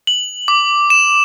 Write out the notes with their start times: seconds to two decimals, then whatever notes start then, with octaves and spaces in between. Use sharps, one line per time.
0.07 F#7
0.48 D6
0.90 E7